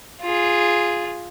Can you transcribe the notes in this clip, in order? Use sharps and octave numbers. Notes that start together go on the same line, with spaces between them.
F4 G#4